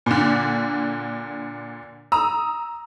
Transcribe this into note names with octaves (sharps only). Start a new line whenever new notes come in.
A#2 D3
A#5 D#6 E6